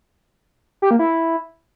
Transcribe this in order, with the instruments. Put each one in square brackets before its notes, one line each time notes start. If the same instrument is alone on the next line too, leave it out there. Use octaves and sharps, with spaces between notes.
[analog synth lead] G4
A#3
E4